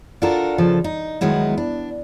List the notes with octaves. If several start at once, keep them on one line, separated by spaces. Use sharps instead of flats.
D4 F4 F#4 A4 A#4
C#3 F3 A4
D#4
D#3 F#3 G#3 B3 E4
D4